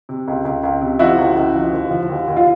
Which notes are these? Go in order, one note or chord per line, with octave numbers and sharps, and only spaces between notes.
C3
C#2
C#2
C#2
C3
F3 E4 F#4
C#2
C#2
F3
D#2
F3
D#2
D#2
F4